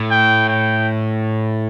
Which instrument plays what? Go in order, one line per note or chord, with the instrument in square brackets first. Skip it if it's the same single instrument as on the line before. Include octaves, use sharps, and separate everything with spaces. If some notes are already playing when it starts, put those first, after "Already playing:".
Already playing: [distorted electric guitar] A2
[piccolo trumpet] G5
G5